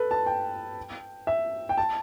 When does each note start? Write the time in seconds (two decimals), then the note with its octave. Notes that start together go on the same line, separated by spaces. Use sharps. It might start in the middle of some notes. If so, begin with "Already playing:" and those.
Already playing: A4 B4
0.11 A5
0.26 G5
1.27 E5
1.69 G5
1.78 A5